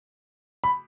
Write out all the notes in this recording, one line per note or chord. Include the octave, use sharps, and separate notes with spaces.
B5